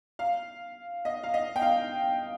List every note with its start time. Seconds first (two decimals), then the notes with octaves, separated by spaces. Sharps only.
0.19 F5
1.05 D#5
1.23 F5
1.34 D#5
1.56 G5
1.62 F5